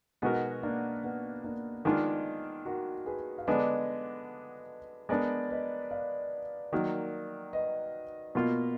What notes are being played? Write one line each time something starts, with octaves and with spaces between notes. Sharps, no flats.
B2 G#3 B3 D#4 F#4 A#4
A#3 D4
B3
A#3 D4
D#3 G#3 B3 D4 D#4 F4
F#4 A#4
G#4 B4
F5
D3 G#3 B3 D4 B4 D#5
G#3 B3 D4 A#4 D5
B4 D#5
D5 F5
D#3 F#3 A#3
B4 D#5
B2 A#3 F4